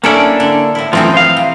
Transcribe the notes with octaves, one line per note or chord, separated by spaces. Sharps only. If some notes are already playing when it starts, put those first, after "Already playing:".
A#3 C#4 D4 E4 A4 D5
D3
A2 E4
F#2 A2 E3 F3 C4 D#4
C5 F5
C3